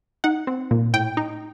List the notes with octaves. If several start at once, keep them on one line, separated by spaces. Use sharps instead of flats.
D#4 F#5
C4
A#2
A2 G5
D#4